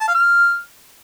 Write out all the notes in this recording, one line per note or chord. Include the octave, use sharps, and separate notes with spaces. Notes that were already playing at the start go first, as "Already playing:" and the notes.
A5
F5
F6